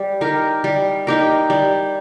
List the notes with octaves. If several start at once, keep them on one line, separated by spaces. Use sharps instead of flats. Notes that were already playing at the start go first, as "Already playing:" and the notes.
Already playing: G3
D#4 G4 A#4
G3
D#4 G4 A#4
G3